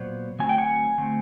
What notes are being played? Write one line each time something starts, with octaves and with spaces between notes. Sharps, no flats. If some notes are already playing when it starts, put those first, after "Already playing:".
Already playing: A#2 F#3 B3 C5 D5
D3 F#3 A3 C4 G#5
G5
F#5 G#5
D3 F#3 A3 C4